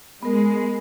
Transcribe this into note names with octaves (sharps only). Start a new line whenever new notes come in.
G#3 B3 A#4